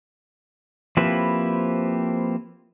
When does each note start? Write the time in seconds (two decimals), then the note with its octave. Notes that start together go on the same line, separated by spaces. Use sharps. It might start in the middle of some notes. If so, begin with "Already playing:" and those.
0.97 F3 A#3 C4 E4 G4 B4